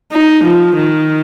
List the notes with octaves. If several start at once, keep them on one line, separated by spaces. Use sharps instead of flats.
D#4
F3
D#3